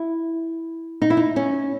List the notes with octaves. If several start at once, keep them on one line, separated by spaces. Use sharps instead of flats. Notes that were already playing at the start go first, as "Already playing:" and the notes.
Already playing: E4
D#4
E4
D#4
C#4